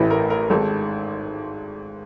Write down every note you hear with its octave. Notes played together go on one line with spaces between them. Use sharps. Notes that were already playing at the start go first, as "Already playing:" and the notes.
Already playing: A1 A2 E3 B4
A#4
A#4
G#1 G#2 D#3 A4